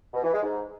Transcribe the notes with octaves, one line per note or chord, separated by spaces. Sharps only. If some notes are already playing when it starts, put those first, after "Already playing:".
B2
E3
G#3
G#2